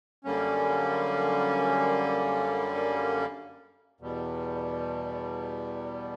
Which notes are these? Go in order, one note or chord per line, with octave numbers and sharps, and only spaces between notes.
F#2 D3 G3 A#3 C#4
E2 B2 G3